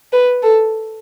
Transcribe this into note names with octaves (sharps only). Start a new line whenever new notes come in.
B4
A4